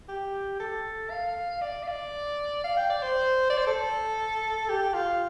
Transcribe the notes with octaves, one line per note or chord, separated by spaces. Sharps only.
G4
A4
F5
D5
F5
D5
F5
G5
D5
C5
D5
C5
A4
G4
F4